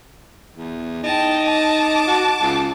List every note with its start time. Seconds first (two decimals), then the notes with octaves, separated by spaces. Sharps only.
0.56 E2
1.04 D#4 G5 A5
1.44 A5 D6
2.07 F#4
2.41 C#2